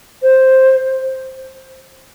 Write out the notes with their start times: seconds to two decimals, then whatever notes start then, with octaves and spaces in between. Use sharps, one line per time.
0.23 C5